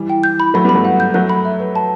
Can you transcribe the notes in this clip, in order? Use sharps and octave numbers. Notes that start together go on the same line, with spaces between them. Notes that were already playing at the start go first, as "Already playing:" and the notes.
Already playing: E3 G3
G5
G6
B5
F#3 A3 B5
G3 B3
B5
F#3 A3
F#5
G6
F#3 A3 F#6
B5
E5
B4
A5